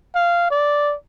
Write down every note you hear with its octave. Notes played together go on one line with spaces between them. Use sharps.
F5
D5